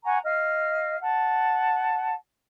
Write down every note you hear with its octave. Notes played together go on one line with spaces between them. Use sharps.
F#5 G#5 A#5 C#6
D#5 F5 F6
F#5 A5